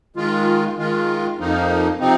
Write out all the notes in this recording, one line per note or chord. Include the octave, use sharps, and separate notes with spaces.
D#3 G#3 F4
D#3 G#3 F4
F2 F3 A#3 D#4
C3 F3 C4 D#4